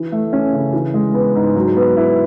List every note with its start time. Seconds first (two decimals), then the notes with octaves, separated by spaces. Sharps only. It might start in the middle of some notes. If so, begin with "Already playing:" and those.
Already playing: E3
0.12 A3
0.33 C#4
0.52 C#3
0.73 E3
0.94 G#3
1.14 B3
1.35 G#2
1.55 F#3
1.76 B3
1.97 E4